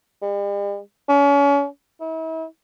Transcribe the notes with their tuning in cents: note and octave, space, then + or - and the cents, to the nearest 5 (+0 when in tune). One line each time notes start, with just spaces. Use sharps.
G3 +45
C#4 +35
E4 -40